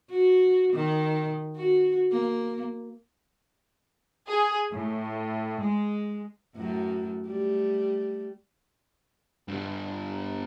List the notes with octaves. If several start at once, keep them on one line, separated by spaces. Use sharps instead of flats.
F#4
D#3
F#4
A#3
G#4
A2
G#3
F#2 A2 F#3
G3 A3
G2 D3